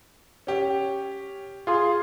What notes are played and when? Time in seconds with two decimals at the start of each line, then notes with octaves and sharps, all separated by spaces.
0.47 C#4 G4
1.67 F4 G#4 C6